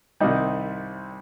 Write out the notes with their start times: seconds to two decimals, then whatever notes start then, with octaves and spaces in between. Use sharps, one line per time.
0.20 C2 C3 D#3 G3 D#4